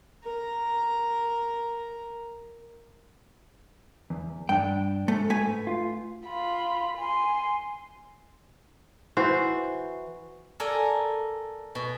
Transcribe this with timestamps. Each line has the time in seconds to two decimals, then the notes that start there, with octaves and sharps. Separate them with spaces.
0.23 A#4 A#5
4.10 E2
4.49 G2 D4 G5
5.08 G#2 A3
5.30 A3 B4 G#5
5.67 F4
6.27 F4 B5
6.98 G#5 C6
9.17 E3 F#4 C5
10.60 A4 A#4 D5 G#5
11.75 B2